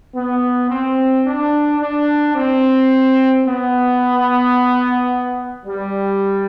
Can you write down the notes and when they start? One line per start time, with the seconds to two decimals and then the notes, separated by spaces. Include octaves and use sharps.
0.15 B3
0.70 C4
1.25 D4
1.80 D4
2.35 C4
3.46 B3
5.66 G3